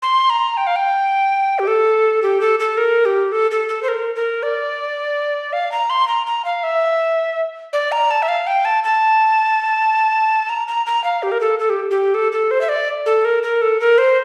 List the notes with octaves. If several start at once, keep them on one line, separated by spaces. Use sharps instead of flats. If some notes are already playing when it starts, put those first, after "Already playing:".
C6
A#5
G5
F5
G5
G4
A4
G4
A4
A4
A#4
G4
A4
A4
A4
C5
A#4
A#4
D5
F5
A#5
C6
A#5
A#5
F5
E5
D5
A#5
A5
E5
F5
G5
A5
A5
A#5
A#5
A#5
F5
G4
A#4
A4
A4
G4
G4
A4
A4
C5
E5
D5
A4
A#4
A#4
A4
A#4
C5